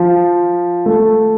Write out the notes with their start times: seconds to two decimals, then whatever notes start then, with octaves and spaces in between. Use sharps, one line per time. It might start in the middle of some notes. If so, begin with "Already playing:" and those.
Already playing: F3
0.86 A3